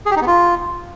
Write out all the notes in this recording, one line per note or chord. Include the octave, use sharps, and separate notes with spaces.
G#4
G4
D#4
B3
F4